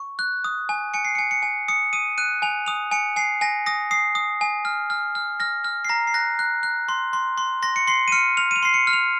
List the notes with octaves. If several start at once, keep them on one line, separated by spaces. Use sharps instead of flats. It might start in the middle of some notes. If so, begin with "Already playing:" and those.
Already playing: C#6
F#6
D#6
G#5
G#5 C#7
C7
C#7
G#5
C#7
G#5
D#6 C#7
D#6 D#7
F#6 D#7
G#5 F7
D#6 F7
G#5 C#7
G#5 C7
G#5 A#6
D#6 A#6
D#6 C7
D#6
G#5
F6
F6
F6
F6 A#6
F6
C7
A#5 A#6
C7
F#6 A#6
F#6
F#6
C6
C6
C6
C6 A#6
C#7
C6 C7
D#7
F6 C#7
F6 F7
D#7
F7
C6 C7
C#7
F6
F7